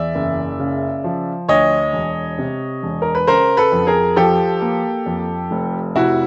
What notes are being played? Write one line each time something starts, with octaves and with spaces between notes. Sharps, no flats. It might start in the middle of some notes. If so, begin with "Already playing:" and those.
Already playing: E2 D5 E5
F#1
C#3
F3
D2 C#5 D#5
E1
C3
E1
A#4
B4
C#3 A#4 C5
A4 B4
F2
G#4 A#4
F3 G4 A4
A#3
F2
F1
C3 E4 F#4